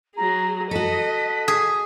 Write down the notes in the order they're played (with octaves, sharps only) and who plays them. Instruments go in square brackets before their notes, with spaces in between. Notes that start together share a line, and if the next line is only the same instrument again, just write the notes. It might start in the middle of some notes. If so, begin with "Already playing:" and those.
[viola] F#3 G#4 [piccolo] A#5
[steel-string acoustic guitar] F#4 A4 [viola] D#5 [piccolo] B6
[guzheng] G#4